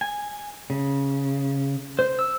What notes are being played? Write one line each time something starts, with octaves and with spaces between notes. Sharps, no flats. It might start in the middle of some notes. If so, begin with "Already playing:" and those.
G#5
C#3
C5
E6